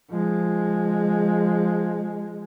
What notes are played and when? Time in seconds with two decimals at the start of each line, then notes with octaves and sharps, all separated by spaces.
0.11 F3 G#3